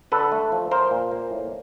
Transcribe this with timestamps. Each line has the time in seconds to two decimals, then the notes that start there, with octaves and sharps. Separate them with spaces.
0.12 D3 A4 B4
0.32 A3
0.52 F3
0.71 F3 A#4 C5
0.91 A#2
1.12 A#3
1.31 A2